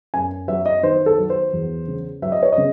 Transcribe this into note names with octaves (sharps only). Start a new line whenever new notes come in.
F#2 G#5
F#3 E5
D#5
D#3 C5
A4
F#3
C5
E2
C#3
F#3 E5
D#5
C#5
D#5
C#3